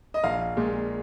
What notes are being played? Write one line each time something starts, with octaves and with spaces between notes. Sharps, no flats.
D#5
A#1 F5
A#2 G#3